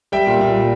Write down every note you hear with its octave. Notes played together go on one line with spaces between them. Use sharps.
G3 E5 G5
A#2
A#2
G3